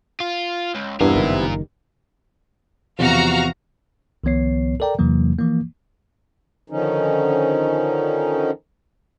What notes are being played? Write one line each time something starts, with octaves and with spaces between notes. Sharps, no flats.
F4
C#2
E2 G2 C3 B3 E4 F4 A#4
F#1 D#3
E2 C3 F3 F#4 F5 A#5
C2 D#3 F3 B3 C#5 C7
A4 A#4 D5 G5 A#5
E2 C3 E3 F#3 A#3
E3 F3 A#3
D3 D#3 F3 C#4 D#4